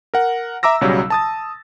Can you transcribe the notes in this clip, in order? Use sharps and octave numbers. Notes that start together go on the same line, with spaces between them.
A#4 F#5
E5 A#5 D6 E6 A#6
B1 C#3 F#3 G3
A5 D#6 A6